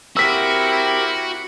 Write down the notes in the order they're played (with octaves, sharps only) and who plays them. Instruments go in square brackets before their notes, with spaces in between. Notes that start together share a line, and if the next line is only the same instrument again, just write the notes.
[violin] C4 E4 [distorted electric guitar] F#4 [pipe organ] G4 A#4 [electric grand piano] E6 B6